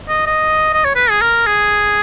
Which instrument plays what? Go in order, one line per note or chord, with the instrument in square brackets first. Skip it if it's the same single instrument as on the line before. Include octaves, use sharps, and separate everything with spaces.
[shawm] D#5
D#5
D#5
C#5
B4
G#4
A#4
G#4